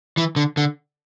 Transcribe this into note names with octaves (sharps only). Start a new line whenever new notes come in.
E3
D3
D3